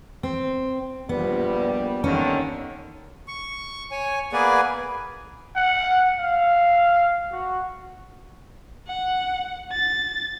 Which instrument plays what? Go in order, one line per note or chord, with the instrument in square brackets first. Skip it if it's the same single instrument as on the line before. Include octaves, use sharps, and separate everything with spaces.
[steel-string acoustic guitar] C4
[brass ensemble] A#1 A#2 G3 [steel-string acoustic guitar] B3
[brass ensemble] D#2 D3 D#3 [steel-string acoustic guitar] C#4
[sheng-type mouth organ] C#6
C#5 G#5
A#3 B3 G#4 B4 D5 G#5
[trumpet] F#5
F5
F#4
[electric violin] F#5
A6